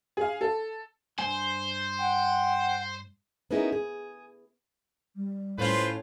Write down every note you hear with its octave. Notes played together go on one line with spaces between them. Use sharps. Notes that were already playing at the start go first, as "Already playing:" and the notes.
G#4 F5
A4
G2 C5 G#5
F#5 G5
B3 C#4 D#4 E4 G#4 A#4
G#4
G3
A2 C#4 F4 B4 C5